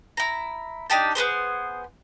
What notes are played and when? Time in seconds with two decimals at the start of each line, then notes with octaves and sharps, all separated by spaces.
0.17 E4 A#5
0.90 D4 D#4 G4 A5
1.15 B3 C4 G#4 C5